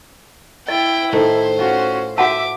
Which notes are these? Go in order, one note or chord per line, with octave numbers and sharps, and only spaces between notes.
E4 D#5 G5
A2 D#3 A3 C5
C#4 F4 F#4
F#4 C5 E5 F#5 A5 D6